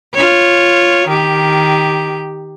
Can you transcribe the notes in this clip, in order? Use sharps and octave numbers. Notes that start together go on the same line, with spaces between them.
F4 C#5
D#3 G4